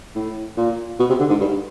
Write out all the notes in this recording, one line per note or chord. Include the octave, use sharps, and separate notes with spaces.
A2
A#2
B2
C3
D3
G#2
G2